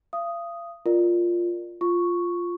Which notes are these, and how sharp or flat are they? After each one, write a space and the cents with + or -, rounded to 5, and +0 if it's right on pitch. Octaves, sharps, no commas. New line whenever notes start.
F5 -40 D#6 +0
F4 +0 A#4 +0 D5 +25
F4 +0 C#6 +0